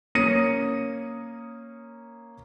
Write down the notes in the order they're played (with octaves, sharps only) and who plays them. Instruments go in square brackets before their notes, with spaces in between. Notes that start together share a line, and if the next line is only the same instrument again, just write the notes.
[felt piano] A#3 C#4 D#6 A#6 C#7 D#7